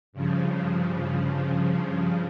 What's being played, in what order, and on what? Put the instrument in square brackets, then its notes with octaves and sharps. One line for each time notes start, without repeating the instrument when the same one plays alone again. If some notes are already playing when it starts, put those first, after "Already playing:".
[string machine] G2 C#3 F3